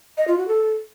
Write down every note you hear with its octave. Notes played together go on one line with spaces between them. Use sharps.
D#5
F4
F#4
A4